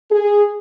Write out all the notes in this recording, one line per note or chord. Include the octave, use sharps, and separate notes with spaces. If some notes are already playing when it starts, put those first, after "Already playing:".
G#4